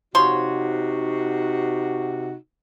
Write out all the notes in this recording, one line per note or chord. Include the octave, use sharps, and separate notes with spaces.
C3 F3 D#4 F#4 C#5 C6